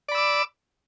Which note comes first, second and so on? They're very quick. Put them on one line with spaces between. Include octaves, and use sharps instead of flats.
D5 B5 E6 D6